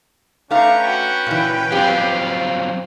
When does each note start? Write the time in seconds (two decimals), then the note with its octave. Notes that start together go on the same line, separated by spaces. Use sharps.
0.51 A3 C#4 D4 B4 F5 G5 A#5 C#6
0.87 F#4
1.27 A#2 E3
1.72 F#3 C4 F4 G4 F5